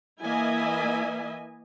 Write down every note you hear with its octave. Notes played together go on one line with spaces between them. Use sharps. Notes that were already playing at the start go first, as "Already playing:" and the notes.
E3 A#3 E4 D#5 E5 G#5